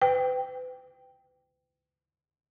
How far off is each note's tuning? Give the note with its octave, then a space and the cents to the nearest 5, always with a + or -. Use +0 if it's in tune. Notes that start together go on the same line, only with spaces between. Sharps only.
B4 +40 G5 +0